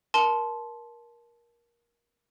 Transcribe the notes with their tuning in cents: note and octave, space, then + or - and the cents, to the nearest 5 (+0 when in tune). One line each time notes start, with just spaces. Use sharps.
A#4 +20 A5 -20 C6 +0